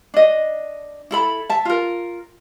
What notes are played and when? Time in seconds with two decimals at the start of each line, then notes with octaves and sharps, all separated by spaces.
0.14 D4 D#5
1.11 E4 A4 B5
1.49 E5 A5
1.65 F4 A#4